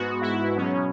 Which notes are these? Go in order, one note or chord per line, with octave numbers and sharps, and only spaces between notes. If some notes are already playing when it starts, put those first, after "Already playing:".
Already playing: G#2 G#3 B3 F#4
E4
B2 F#3 B3 C#4